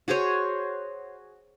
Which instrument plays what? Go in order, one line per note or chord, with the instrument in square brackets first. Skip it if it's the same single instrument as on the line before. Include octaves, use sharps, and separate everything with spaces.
[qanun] F#4 G#4 C5 C#5